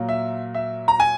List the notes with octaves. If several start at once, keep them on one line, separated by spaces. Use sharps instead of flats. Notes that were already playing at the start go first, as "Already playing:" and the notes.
Already playing: A#2 F#3 A#3
E5
E5
A#5
G#5